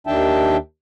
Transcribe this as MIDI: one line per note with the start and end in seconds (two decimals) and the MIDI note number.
0.07 0.57 39
0.07 0.57 51
0.07 0.57 62
0.07 0.57 76
0.07 0.57 79
0.07 0.57 81